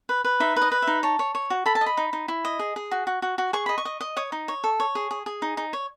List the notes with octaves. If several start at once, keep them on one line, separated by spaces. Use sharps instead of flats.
B4
B4
D#4 E5
B4
D#5
B4
D#4 E5
C#5 A5
C#5
C#5
F#4
A4 B5
A5
D#5
B5
D#4
D#4
E4
D#5
G#4
G#4
F#4
F#4
F#4
F#4
G#4 C#6
D#5 B5
C#6
D#5
D#5
C#5 D#6
D#4
C#5
A4
C#5
G#4
G#4
G#4
D#4
D#4
C#5